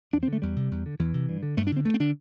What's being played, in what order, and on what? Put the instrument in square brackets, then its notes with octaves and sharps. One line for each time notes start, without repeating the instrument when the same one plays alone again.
[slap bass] E2 D4
C4
D3
A3
E2 G3
C3
E2
D3
E2 E3
C3
G2
D3
G2 A3
D4
D3 C4
G2 A3
C4
D3 D4